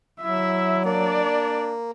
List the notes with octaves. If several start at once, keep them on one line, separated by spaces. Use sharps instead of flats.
F#3 E4 E5
A#3 D4 D5